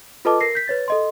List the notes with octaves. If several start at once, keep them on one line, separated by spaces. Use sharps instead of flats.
F4 A4 B4 D#5 A5 D6
A#4 A#6 C7
G6 B6
B4 C#5 A6
A4 D#5 C6